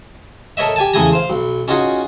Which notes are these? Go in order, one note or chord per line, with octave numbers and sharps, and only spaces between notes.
A4 A#4 C#5 D#5 E5
G4 G#5 A5
E2 C#3 A3 G#4 G#5 A#5
C5 F5
B1
C#4 D#4 F4 F#4 G#4